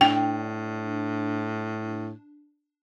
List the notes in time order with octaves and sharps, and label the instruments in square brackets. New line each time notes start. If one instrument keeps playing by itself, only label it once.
[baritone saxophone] A2 [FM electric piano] D4 [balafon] G5